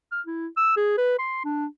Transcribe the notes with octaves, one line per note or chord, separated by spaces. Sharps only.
F6
E4
E6
G#4
B4
C6
D4